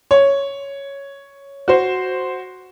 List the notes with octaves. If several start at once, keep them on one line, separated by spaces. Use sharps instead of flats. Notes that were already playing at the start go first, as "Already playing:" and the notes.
C#5
F#4 C5